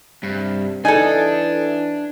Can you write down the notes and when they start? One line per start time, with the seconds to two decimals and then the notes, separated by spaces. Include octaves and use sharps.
0.23 G2 C3
0.85 E3 D4 D#4 A4 G#5